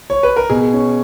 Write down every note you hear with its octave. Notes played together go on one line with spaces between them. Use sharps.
C#5
B4
A#4
B2 G#4
C#4